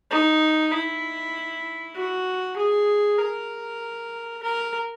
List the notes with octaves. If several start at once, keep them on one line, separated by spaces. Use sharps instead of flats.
D#4
E4
F#4
G#4
A#4
A#4